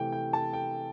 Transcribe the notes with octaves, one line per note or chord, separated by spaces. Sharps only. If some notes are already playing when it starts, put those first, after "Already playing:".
Already playing: C3 E3 A3 G5
G5
A5
G5